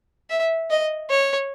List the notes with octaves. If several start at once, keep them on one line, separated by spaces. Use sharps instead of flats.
E5
D#5
C#5